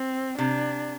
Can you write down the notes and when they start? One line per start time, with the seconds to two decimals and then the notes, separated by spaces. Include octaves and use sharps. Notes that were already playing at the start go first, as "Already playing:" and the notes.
Already playing: C4
0.38 C3 D4